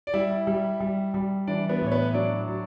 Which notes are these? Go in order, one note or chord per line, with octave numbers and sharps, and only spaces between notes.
D5
G3 E4 E5
G3
G3
G3
E3 D4 D5
B3 B4
A2
C#5
B3 B4
F#3 D4 D5
F#3